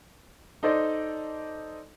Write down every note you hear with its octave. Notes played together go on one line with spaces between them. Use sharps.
D#4 A4 C5 D5 D#5